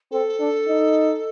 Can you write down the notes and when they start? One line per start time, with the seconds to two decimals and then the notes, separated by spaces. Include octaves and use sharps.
0.11 C4 A4
0.40 D4
0.68 D#4